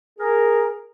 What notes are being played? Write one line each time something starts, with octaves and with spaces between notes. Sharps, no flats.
G#4 A#4